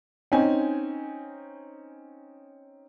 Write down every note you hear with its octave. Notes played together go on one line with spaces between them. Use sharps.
C4 C#4 D#4 G#5